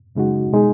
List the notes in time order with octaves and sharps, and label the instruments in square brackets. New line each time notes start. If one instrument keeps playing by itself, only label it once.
[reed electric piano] F#2 C#3 G#3 D#4 F#4
B2 G#3 D#4 G#4